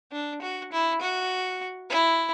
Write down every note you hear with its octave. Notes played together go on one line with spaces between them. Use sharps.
D4
F#4
E4
F#4
E4